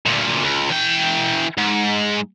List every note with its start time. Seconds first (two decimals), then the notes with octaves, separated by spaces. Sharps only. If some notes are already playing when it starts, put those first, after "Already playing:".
0.06 D2 A#2
0.43 C#2
0.71 E3 G5
1.58 G#2